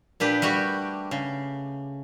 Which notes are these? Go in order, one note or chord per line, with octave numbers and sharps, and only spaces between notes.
A#2 D4 G4 B4
G3 A3 F#4 G4
C#3